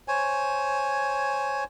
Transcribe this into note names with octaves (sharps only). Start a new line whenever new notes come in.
C5 C#5 G#5